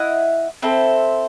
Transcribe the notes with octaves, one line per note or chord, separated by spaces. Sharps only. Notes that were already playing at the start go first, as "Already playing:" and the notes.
Already playing: E4 D#5 F#5
C4 E4 A4 C5